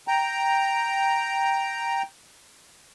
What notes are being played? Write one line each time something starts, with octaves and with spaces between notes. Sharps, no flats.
G5 A#5